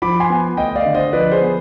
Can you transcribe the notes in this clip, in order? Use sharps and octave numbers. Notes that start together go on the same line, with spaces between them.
F3 B5 D6
G#5 C6
B3
D2 D#5 G5
D5 F5
D3
C5 D#5
F3 B4 D5
G#4 C5
B3